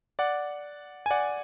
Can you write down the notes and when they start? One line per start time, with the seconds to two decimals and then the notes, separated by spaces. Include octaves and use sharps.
0.19 D5 F#5
1.06 G#5
1.10 D5 F#5